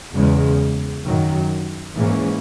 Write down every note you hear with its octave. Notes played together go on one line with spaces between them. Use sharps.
E2 C#3 G#3
F#2 D#3 F#3
G#2 E3 A#3 C#4